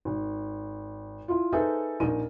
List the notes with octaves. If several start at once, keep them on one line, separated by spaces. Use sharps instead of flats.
G#1
E4 F4
D#4 G#4 A4 B4 C5 E5
A#1 D#4 A#4 D#7